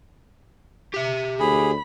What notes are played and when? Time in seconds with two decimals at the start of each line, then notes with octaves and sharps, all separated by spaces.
0.94 G4 E5
1.40 D2 G#4 B5